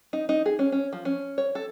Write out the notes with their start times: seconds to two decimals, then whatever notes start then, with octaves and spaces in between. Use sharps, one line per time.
0.13 D#4
0.29 D#4
0.46 G#4
0.59 C#4
0.72 C#4
0.93 F3
1.05 C#4
1.38 C#5
1.55 A4